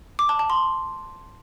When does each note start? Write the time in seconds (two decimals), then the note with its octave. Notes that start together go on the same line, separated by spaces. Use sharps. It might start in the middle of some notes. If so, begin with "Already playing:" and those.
0.19 D6
0.29 A5
0.39 A5
0.50 C6